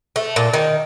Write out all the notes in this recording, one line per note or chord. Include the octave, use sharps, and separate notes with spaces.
A3
A#2
D#3